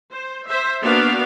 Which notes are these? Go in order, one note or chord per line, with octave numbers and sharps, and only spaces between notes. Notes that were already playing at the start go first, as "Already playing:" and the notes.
C5
C5 E5
A#3 B3 D4 F#4 D5 F5